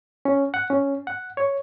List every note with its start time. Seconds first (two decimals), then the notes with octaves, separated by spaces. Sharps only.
0.25 C#4
0.54 F#5
0.70 C#4
1.07 F#5
1.37 C#5